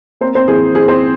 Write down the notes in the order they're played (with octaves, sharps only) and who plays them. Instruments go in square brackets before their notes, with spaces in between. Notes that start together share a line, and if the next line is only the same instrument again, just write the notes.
[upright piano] A#3 C4 C5
C4 C5
E3 G#4
E3 G#4
C4 C5